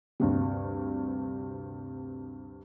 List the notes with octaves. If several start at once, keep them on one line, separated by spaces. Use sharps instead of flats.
D2 G2 C3